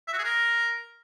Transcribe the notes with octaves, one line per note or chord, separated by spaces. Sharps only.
E5
F#4
G#4
A#4